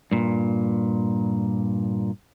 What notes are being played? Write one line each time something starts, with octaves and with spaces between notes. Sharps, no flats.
G2 A#2